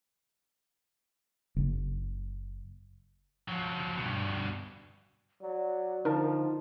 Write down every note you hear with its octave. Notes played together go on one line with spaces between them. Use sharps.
F#1
F3 F#3
G2 B2
F#3 D5
D3 F3 D#4 A#4 A5